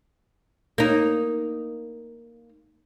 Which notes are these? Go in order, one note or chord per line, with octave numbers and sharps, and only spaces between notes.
A#3 D#4